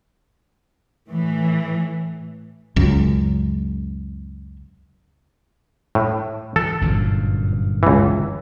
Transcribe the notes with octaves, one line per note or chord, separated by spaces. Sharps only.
A2 E3
C#2 F#2
A2
E3 A4
G1 F#2 A#2
C#2 E3